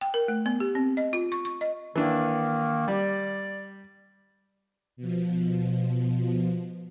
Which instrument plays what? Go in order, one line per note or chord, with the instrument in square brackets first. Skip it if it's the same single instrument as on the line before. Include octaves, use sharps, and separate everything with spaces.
[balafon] G5
A#4
A3
B3
G4
C4
D#5
F4
C#6
C#6
D#5
[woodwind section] D#3 A#3 [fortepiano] E3 D4
[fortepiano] G3 [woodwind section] D5
[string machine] B2 F3